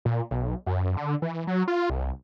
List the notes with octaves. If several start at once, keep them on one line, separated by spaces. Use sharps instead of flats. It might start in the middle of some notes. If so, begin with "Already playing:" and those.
A#2
B1
F#2
D3
E3
F#3
F4
C2